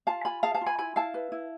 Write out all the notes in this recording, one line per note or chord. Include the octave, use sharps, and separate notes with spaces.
F4 F5 A5
F4 G#5 B5
G#4 F5 A5
F5 A5
F4
G#5 B5
E4 G#5 B5
E4 F5 A5
B4
E4